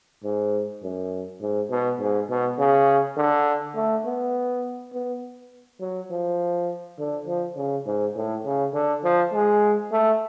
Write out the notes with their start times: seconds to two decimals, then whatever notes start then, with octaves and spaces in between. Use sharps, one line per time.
0.24 G#2
0.83 F#2
1.41 G#2
1.70 B2
2.00 G#2
2.29 B2
2.58 C#3
3.17 D3
3.76 A3
4.05 B3
4.93 B3
5.81 F#3
6.11 F3
6.98 D3
7.27 F3
7.56 C#3
7.86 G#2
8.16 A2
8.45 C#3
8.74 D3
9.04 F3
9.33 G#3
9.91 A3